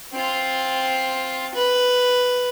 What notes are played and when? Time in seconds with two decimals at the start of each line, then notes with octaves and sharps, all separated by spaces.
0.12 C4 F4
1.54 B4